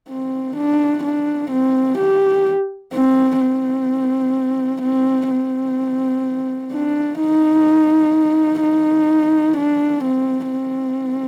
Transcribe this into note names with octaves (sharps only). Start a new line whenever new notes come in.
C4
D4
D4
C4
G4
C4
C4
C4
C4
D4
D#4
D#4
D4
C4
C4